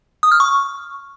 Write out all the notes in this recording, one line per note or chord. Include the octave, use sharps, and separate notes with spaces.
D#6
F6
C#6